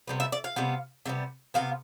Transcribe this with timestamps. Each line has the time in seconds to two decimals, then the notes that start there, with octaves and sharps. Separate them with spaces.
0.08 C3 G3 B3
0.20 E5
0.32 D5
0.44 F5
0.56 C3 G3 B3
1.06 C3 G3 B3
1.54 C3 G3 B3 F5